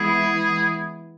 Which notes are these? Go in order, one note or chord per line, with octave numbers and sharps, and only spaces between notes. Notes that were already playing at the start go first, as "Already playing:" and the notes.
Already playing: E3 G#3 B3 E4 G#4